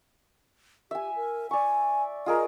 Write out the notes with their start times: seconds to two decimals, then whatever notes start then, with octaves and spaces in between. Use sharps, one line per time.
0.91 G4 E5 G#5
1.16 A#4
1.51 D5 G#5 C#6
2.26 F4 G#4 A#4 D#5